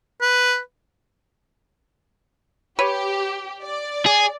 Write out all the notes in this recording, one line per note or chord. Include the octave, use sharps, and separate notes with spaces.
B4
G4 B4 C#5
D5
G#4